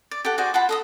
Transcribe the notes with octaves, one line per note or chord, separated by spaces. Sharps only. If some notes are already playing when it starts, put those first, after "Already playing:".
D5
G4 A4 F#5
F#4 G#4 C5 D5
F4 F#5 A5 B5
A4 D#5 D#6